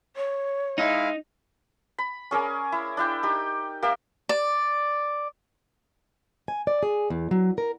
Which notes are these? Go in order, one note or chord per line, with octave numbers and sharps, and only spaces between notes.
C#5
G#3 D#4 E4 F5
B5
C#4 G#4 A#4 D5
E4
D4 E4 G5
D#4 G4
A#3 G4 D5 E5
D5
G#5
D5
G#4
E2
F#3
A#4